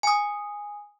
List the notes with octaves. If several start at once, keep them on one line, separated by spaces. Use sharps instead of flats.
G#5 D#6